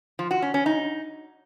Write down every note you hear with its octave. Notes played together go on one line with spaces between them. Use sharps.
F3
F#4
C#4
C#4
D#4